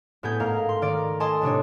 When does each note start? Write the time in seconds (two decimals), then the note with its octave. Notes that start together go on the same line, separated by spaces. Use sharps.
0.23 A2 B3 G#4 G6
0.40 G#2 A3 A#4 F5
0.69 C6
0.82 D#3 A#4 D5
1.20 A4 D#5 G#5 A5 C6 D#6
1.42 A2 C3 D4 C#5